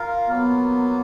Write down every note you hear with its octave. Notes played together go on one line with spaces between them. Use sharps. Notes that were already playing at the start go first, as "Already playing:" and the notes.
Already playing: F4 A#4 F5
F#3 A#3 B3 F4